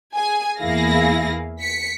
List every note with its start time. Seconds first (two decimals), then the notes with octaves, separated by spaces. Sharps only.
0.15 G#4 G#5
0.59 E2 A#3 E4 G#4 F5 A#6
1.60 B6 C#7